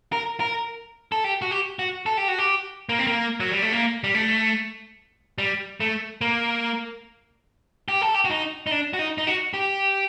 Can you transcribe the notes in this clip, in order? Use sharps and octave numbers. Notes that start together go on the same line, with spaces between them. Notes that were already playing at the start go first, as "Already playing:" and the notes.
A#4
A#4
A4
G4
F#4
G4
F#4
A4
G4
F#4
G4
A#3
C4
A#3
F#3
G3
A3
A#3
G3
A3
G3
A3
A#3
G4
A4
G4
F#4
D#4
D#4
D4
F#4
D#4
D#4
F#4
G4